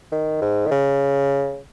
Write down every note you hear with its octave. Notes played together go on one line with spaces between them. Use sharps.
D#3
G#2
D#3
C#3